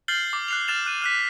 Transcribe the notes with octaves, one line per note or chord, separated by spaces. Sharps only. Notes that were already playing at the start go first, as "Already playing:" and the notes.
F6 G6 A6 C7 F#7 G7
D6
F#6 C7 F7
F6 F#6 A6 E7 F7
F#6 D#7
F6 F#6 B6